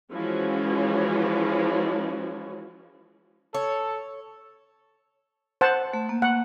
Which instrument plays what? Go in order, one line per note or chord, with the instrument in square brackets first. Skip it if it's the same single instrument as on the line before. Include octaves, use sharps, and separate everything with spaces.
[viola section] E3 F3 G#3 C#4 F#4
[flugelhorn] A4 [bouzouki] C#5
[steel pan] C5 F#5 A5
[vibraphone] A3
A#3
[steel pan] F#5